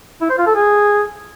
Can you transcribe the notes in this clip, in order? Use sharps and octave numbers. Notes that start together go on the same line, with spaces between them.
E4
C5
F4
A4
G#4